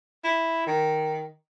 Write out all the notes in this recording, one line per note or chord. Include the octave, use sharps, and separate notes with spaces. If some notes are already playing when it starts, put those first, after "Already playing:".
E4
D#3